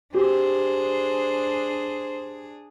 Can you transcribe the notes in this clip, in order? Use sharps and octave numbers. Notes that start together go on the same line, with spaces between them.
D4 G4 G#4 C5